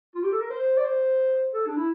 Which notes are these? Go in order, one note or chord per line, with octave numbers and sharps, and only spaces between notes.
F4
G4
A4
A#4
C5
D5
C5
A4
D4
E4